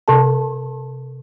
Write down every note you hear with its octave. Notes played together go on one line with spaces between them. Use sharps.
C3 A4 A5